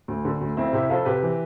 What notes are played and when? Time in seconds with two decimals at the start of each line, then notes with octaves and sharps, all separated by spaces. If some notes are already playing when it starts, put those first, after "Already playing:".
0.08 D2
0.25 D3
0.41 D2
0.57 F2 C4 E4
0.73 C3 E4 G4
0.89 F2 F4 A4
1.05 C3 G4 B4
1.22 E3